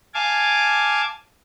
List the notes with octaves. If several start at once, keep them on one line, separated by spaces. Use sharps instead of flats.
F5 G#5 A5 D6